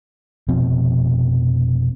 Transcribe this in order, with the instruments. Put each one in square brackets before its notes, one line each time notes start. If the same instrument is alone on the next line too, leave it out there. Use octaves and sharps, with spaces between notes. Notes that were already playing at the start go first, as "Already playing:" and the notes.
[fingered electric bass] F1 B2 F3 C4